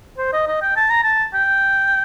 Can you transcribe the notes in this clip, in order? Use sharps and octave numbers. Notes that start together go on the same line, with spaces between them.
C5
D#5
D#5
G5
A5
A#5
A5
G5